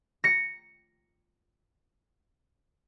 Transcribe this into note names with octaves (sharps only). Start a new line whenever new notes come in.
A#6 C#7